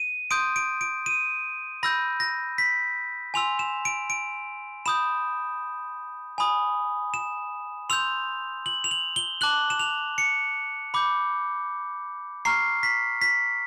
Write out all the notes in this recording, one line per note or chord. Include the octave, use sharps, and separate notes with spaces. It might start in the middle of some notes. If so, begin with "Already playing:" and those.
Already playing: D#7
C6 D#6 G6 D7
D7
D7
D#7
B5 E6 G6 A#6
A#6
B6
G#5 C6 E6 F7
E7
D7
D7
B5 D#6 G6 E7
G#5 B5 D#6
E7
C6 E6 G6 F7
F#7
F7
F#7
G7
A5 D6 F#6 F#7
E7
F7
C#7
B5 D6 G6
A#5 C#6 F6 C7
B6
B6